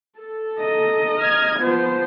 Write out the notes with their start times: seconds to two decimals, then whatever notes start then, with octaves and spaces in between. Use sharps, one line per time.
0.18 A4
0.59 D#5 A#5
1.21 F6 G#6
1.60 F3 B3 C5